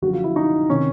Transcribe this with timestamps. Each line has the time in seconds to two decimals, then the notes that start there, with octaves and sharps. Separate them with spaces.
0.02 F#1 F#2 D3 F3 F#4
0.13 F4
0.24 E4
0.36 D#4
0.70 C3 D#3 C#4